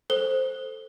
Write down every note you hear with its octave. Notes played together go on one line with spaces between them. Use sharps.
A4 C5 G7